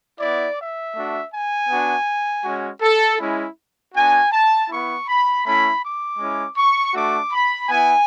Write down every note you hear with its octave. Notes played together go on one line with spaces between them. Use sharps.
B3 E4 D5
E5
A3 D4 F#4
G#5
B3 D4 F#4
G#3 C#4 F#4
A4
G#3 C#4 E4
B3 D4 F#4 G#5
A5
B3 E4 C#6
B5
A3 C#4 E4 B5
D6
G#3 C#4 E4
C#6
A3 D4 F#4 D6
B5
B3 E4 G#5